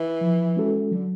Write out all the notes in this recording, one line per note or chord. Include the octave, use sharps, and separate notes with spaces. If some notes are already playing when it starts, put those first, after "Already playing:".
Already playing: E3
F3
G#3 C#4 F#4 A4
D3 F#3